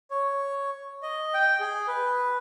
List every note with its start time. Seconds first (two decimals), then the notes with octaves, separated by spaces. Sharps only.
0.11 C#5
1.03 D#5
1.34 G5
1.60 G#4
1.87 B4